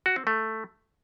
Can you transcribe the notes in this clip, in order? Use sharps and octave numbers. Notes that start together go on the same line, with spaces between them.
F#4
C4
A3